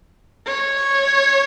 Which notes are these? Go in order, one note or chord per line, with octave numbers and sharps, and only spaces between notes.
C#5